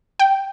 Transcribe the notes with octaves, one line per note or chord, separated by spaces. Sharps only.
G5